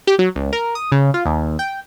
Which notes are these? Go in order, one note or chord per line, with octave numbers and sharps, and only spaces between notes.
G4
F#3
C#2
A#4
D#6
C#3
F4
D#2
G5